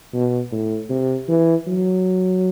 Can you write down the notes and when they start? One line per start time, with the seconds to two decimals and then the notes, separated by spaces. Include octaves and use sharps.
0.14 B2
0.52 A2
0.90 C3
1.29 E3
1.67 F#3